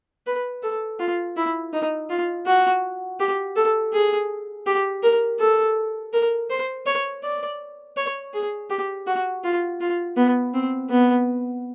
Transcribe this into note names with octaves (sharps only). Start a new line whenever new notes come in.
B4
A4
F4
E4
D#4
F4
F#4
G4
A4
G#4
G4
A#4
A4
A#4
C5
C#5
D5
C#5
G#4
G4
F#4
F4
F4
B3
C4
B3